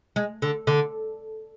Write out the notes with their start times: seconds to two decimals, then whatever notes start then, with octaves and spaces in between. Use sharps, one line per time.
0.16 G#3
0.42 D3
0.67 D3